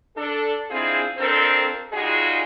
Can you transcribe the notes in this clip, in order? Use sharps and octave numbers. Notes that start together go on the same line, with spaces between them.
D4 A4
G#3 C4 D4 E4 F4 G#4
F2 C4 D4 A4 A#4 C5
G3 G#3 D#4 F4 F#4 G#4